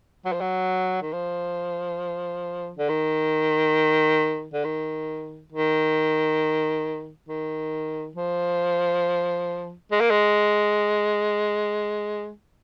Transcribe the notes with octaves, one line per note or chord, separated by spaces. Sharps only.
F#3
F3
F#3
D#3
F3
D3
D#3
D3
D#3
D#3
D#3
F3
G#3
A#3
G#3